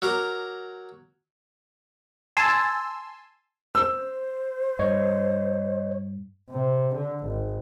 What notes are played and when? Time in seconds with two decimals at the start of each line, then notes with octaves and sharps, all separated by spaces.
0.02 F#3 A#4 A#5 D6
2.37 G#5 A5 C6 E6
3.75 C5 E6
4.79 G2 C#5 D#5
6.51 C3
6.95 D3
7.25 G#1